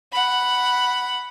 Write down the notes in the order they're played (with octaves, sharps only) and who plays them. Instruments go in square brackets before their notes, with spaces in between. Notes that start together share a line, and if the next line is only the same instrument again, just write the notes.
[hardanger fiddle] F#5 B5